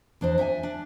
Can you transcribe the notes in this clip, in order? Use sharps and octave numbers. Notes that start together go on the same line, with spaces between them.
E2 D4 C5 D#5
C5 E5 G5 G#5
D4